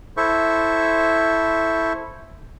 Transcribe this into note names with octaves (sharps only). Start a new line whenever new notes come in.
E4 A4 C5 E5 C#6